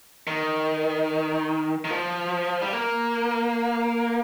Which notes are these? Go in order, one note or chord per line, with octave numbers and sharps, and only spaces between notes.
D#3
D#3
F3
G3
A#3